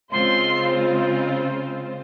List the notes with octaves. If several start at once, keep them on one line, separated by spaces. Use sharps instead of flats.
C#3 G#3 C4 F4 C5 C6